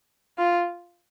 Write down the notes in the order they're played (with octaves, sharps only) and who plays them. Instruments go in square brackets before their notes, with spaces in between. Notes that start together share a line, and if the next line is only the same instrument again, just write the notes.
[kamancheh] F4